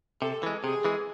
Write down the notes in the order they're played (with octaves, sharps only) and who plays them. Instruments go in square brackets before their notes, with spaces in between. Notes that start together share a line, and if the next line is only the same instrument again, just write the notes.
[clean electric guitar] C3 [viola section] A4
[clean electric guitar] E3 G#3
[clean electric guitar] C3 [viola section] G#4
[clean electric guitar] E3 G#3